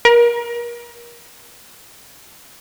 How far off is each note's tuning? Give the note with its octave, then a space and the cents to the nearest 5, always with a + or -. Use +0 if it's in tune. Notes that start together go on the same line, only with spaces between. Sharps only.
A#4 +35